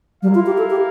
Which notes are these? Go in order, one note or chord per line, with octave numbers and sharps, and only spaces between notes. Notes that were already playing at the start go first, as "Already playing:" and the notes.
G3 E4 A#4 F5
F4
G4
A4
G4